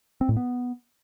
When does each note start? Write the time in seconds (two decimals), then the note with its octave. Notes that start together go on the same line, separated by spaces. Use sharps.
0.21 C4
0.29 A2
0.37 B3